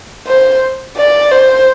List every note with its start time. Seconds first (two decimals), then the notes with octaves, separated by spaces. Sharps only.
0.27 C5
0.96 D5
1.31 C5